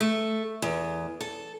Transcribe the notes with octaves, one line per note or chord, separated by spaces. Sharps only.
A3
E2
A4